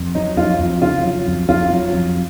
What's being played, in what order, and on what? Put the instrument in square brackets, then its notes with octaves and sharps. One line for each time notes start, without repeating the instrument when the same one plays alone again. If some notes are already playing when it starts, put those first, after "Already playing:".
Already playing: [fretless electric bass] F2
[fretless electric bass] F#3 [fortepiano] D#4
[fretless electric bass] F2 [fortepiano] F4
[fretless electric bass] F2
[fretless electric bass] C#3 [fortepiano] F4
[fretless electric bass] F#3
F2
[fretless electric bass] F2 [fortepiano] F4
[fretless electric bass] F#3
F2